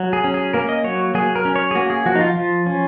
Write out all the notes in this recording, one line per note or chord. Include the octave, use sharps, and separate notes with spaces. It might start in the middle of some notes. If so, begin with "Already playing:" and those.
Already playing: F#3
G#4
C#4
G#4
A#3 A#4
D#5
F#3 C#5
F#3 G#4
A#4
C#4
C#5
G#4
A#3 F#4
G#4
F3 F#4
D#4
F4
F3
C#4